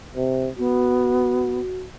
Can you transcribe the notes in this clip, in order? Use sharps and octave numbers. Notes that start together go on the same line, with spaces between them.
C3
B3 F#4